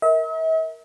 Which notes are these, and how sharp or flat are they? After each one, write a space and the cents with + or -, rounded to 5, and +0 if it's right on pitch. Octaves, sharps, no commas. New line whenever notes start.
A#4 +0 E5 -45